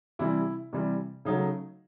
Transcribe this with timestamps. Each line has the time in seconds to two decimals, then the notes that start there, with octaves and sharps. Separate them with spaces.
0.19 C3 E3 G3 E4
0.73 C3 E3 G3
1.25 C#3 F#3 A3 D#4